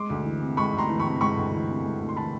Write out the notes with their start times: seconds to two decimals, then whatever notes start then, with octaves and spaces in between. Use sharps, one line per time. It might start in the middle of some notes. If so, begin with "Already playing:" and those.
Already playing: G#3 C6 D6
0.10 D2
0.25 E3
0.42 C3
0.57 G#3 B5 C#6
0.73 D2
0.78 A#5 C6
0.88 E3
0.99 B5 C#6
1.05 C3
1.21 G#3 B5 C#6
1.37 D2
1.53 E3
1.69 C3
1.84 G#3
2.01 D2
2.09 C6
2.17 E3 A5 B5